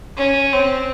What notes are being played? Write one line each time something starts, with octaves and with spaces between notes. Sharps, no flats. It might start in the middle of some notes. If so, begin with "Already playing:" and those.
C#4
C4